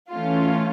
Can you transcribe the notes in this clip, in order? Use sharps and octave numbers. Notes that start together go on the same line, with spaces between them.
E3 A3 C#4 F4